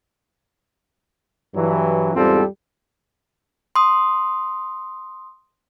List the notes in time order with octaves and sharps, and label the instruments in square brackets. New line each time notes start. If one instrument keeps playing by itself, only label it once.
[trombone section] G2 E3 F#3
E2 G#2 G3 C4 F4 A4
[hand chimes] C6 D#6